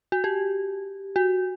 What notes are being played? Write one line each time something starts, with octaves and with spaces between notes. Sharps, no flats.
F#4
G4
F#4